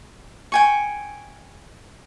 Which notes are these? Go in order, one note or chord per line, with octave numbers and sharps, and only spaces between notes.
G5 G#5 C#6